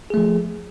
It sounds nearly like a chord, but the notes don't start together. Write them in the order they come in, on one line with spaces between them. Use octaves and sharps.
G#4 A3 F3